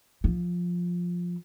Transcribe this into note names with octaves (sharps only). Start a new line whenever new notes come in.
F3